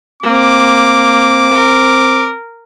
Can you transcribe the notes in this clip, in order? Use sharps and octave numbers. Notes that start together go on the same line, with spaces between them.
A#3 C4 D6
A#4